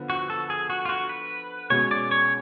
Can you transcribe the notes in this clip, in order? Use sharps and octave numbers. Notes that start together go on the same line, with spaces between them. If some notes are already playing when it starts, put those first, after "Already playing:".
Already playing: D3 F3 B3
F#4
A4
G#4
F#4
F4
F#4
B4
B2 G#3 C#4 G#4 C#5
D5
C#5